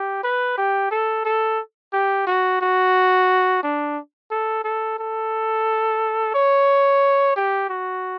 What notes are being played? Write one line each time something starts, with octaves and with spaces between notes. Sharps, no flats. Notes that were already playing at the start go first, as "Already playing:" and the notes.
Already playing: G4
B4
G4
A4
A4
G4
F#4
F#4
D4
A4
A4
A4
C#5
G4
F#4